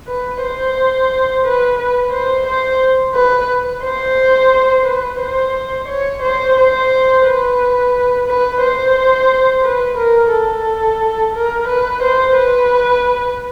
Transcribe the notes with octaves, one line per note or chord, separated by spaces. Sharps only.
B4
C5
B4
B4
C5
C5
B4
C5
B4
C5
C#5
C5
C5
B4
B4
C5
B4
A#4
A4
A#4
B4
C5
B4